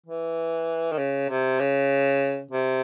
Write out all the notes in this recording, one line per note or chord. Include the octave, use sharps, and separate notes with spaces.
E3
D#3
C#3
C3
C#3
C3